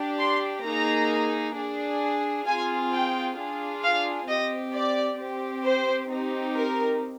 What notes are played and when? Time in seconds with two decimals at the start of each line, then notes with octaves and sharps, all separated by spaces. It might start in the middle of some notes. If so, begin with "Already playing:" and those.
Already playing: D4 G4
0.19 C6
0.64 A#3 D#4 G#4 A#5
1.56 D4 G#4
2.46 C4 F4 G#4 G#5
2.92 G5
3.38 D4 F4 G#4
3.84 F5
4.28 C4 G4 D#5
4.74 D5
5.19 C4 G4
5.65 C5
6.11 C4 D#4 G4
6.56 A#4